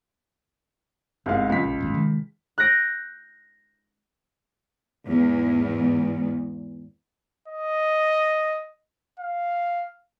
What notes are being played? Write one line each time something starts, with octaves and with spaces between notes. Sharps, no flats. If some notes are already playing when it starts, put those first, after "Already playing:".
G1 C2 G#2 F5
C#2 F3 A#3 B6
A#1
A#1 E2 G#2
C3 D#3 G#3
F#6 G6 A#6 D7
E2 G#2
D#5
F5